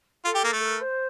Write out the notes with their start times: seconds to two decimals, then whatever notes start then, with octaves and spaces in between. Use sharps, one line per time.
0.25 F4 A4
0.35 G4
0.44 A#3
0.53 A3
0.62 A#4
0.80 C5